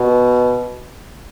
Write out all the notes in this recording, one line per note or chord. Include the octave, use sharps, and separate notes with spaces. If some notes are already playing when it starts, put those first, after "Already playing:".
Already playing: B2